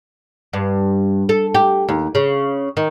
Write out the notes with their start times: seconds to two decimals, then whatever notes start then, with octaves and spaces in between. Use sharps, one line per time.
0.53 G2
1.29 A4
1.54 G4
1.89 D#2
2.15 C#3
2.77 D#3